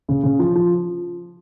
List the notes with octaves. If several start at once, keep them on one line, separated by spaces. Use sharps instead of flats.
C#3
C#3
F3
F3